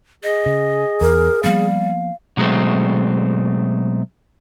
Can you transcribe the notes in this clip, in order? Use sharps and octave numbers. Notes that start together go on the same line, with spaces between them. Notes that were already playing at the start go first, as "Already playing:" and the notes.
G#4 D#5
C#3
E2 A#4
F3 G3 A#3 B3 F5
B2 F#3 G#3 A3 C4